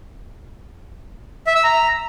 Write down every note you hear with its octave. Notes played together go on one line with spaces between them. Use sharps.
E5
E6
A#5